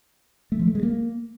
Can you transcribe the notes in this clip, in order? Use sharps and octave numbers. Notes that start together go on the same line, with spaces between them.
A3
F3
A3
G#3
A#3